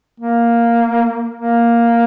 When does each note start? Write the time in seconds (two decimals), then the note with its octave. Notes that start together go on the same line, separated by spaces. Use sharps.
0.20 A#3
1.35 A#3